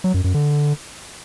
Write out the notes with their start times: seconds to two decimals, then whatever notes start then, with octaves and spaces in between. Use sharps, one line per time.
0.04 F#3
0.14 F#2
0.24 F#2
0.34 D3